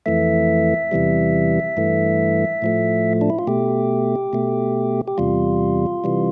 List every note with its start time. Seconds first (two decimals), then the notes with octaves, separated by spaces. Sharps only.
0.06 F2 E3 A3 E5
0.92 E2 C3 E3 G3
1.77 G2 E3 A3
2.62 A2 F3 A3
3.21 D4
3.30 E4
3.39 F4
3.47 B2 A3 G4
4.33 B2 A3
5.08 G4
5.18 E2 C3 G3 F4
6.04 C3 E3 G3